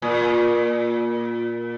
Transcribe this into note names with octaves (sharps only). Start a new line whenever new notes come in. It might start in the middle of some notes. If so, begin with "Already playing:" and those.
A#2